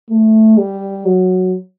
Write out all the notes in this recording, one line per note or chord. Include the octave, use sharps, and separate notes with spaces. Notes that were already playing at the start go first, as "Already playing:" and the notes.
A3
G3
F#3